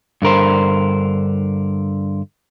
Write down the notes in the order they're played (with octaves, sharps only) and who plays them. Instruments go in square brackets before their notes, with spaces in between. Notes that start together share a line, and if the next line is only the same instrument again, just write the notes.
[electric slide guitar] G2 D3 A#4 C5